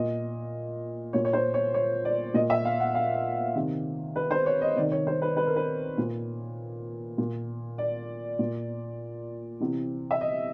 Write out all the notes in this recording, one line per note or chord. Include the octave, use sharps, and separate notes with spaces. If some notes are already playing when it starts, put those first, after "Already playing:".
Already playing: A#2 D#5
A#2 C#5
C#5
C5
C#5
C#5
D5
A#2 D#5
E5
F5
F#5
F5
C3 D#3
B4
C5
C#5
D#5
C3 D#3 D5
C#5
C5
B4
B4
A#4
B4
A#2
A#2
D5
A#2
C3 E3
E5
D#5